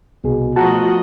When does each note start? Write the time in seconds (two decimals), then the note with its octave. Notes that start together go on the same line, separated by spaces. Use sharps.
0.24 C2 B2 G#4
0.56 F3 A3 F#4 D#5 A5 A#5